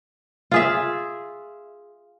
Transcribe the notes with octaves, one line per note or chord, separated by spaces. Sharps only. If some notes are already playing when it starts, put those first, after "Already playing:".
F4 G#4 E5